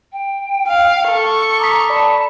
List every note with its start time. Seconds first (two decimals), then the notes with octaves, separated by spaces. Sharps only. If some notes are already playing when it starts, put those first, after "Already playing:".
0.13 G5
0.67 F5
1.08 A4 C#6
1.59 A#5 D6 D#6 B6
1.90 D5 A5 B5